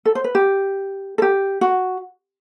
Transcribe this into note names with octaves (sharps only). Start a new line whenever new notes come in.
A4
C5
B4
G4
A4
G4
F#4